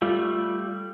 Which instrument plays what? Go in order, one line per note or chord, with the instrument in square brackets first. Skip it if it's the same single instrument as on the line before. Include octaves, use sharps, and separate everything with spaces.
[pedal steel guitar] G3 A3 [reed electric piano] F4